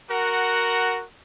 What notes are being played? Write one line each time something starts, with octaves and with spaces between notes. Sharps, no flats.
F#4 A#4 F#5